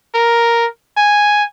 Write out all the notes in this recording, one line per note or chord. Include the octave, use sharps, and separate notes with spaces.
A#4
G#5